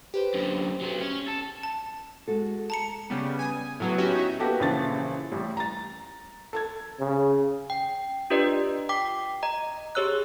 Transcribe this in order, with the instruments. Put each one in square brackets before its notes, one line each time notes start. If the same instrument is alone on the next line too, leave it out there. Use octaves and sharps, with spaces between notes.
[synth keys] G4 B4 C5
[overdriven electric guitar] F#2 D3
F#3 B3
C#4
A4
[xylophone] A5
[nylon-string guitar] G#3 F#4 A4
[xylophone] A5 A#5 C#7
[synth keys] C#3 G3 B3
G#5 D#6
A2 F#3 B3
C#4 E4 F#4 G4
D#4 E5
[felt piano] A#3 B3 F#4 G4 A4
A#1 C#3 E3 A5 A6
A1 G3
A#5 A6
A4 A5 G#6
[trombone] C#3
[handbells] G5
D4 F4 G4 B4 D5 D#5
G5 D6 B6
D#5 A#5
G4 G#4 C#5 E6 F#6